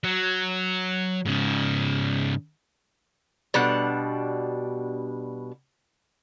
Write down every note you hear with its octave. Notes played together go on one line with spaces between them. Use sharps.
F#3
G#2 C#3
B2 G3 D4 F#5